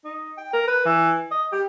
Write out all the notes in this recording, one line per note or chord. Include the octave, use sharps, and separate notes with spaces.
D#4
G5
A#4
B4
E3
D#5
G4